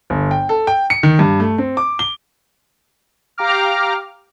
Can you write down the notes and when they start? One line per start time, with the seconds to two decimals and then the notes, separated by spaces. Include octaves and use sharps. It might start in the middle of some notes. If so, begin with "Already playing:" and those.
0.10 G1
0.31 G5
0.49 A4
0.67 G5
0.90 C#7
1.03 D#3
1.19 G2
1.40 A3
1.58 C4
1.77 D6
1.99 G7
3.38 G4 F5 G5 A#5 D6 F6